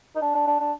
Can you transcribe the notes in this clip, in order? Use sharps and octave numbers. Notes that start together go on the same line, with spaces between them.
D#4
D4
D4
D4
D4